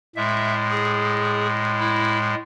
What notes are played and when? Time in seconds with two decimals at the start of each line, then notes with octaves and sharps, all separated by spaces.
0.16 A2 G#3 E5
0.71 G#4
1.80 E4